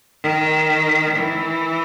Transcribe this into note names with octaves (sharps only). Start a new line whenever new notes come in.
D#3
E3